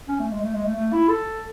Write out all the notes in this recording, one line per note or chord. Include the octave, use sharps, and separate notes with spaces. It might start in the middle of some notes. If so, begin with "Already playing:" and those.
C#4
A3
G#3
A3
G#3
A3
A3
E4
A4